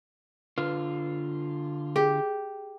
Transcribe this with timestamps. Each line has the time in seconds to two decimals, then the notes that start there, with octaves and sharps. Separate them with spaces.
0.58 D3 F4 B4
1.96 G4 G#4